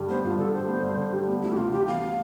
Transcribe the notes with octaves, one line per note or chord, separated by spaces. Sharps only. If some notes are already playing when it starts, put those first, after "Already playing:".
Already playing: G2 D3 G3
B3 C5
G2 F4
D3 A4
G3 C5
B3
G2
D3
G3
B3
D2 E4
G4
C3 F4
E3 G4
B3 F5